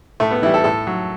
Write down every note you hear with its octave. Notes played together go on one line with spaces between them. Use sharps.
A2 A3
B3
E3 G3 E4
A4
A2 A4
F#3